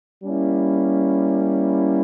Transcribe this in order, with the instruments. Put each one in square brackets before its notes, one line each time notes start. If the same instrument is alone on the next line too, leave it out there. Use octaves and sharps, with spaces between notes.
[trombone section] G3 A#3 C#4 E4